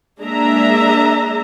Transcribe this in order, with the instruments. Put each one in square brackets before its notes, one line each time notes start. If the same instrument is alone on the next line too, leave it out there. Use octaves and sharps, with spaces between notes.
[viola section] G#3 A#3 D4 G#4 E5 A#5